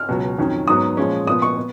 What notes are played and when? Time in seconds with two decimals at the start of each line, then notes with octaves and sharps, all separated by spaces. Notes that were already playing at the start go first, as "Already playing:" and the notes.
Already playing: F6
0.09 C#2 B2 F#3
0.39 F2 D#3 F#3 C#4
0.68 G#2 F#3 B3 D#6
0.97 A#2 F3 G#3 C#4
1.27 A#2 F3 B3 D#6
1.42 C#6
1.57 B3